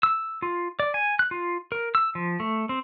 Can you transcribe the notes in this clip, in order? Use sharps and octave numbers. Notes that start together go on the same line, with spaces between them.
E6
F4
D5
G#5
F#6
F4
A#4
E6
F3
A3
C4